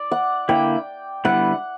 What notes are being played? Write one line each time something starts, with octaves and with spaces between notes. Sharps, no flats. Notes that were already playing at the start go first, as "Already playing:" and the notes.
Already playing: D5
F#5
D3 A#3 E4 G5
D3 G3 B3 E4 B4 F#5